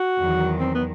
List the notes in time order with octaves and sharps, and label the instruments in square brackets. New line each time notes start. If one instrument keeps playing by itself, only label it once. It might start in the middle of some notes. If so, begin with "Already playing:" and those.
Already playing: [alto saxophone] F#4
[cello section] E2 D#3 F#3
[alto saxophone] C4
B3